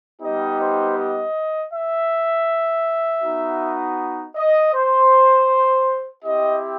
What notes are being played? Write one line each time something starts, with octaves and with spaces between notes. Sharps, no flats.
G3 B3 D#4 G4 D#5
C5
D#5
E5
B3 D#4 F#4
D#5
C5
C4 E4 G4 D#5